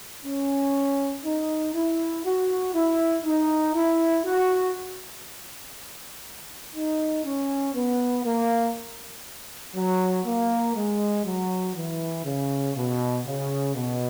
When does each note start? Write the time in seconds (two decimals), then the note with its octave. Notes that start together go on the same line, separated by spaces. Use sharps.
0.24 C#4
1.24 D#4
1.74 E4
2.25 F#4
2.74 E4
3.24 D#4
3.74 E4
4.25 F#4
6.75 D#4
7.24 C#4
7.75 B3
8.24 A#3
9.75 F#3
10.26 A#3
10.75 G#3
11.25 F#3
11.76 E3
12.25 C#3
12.75 B2
13.26 C#3
13.75 B2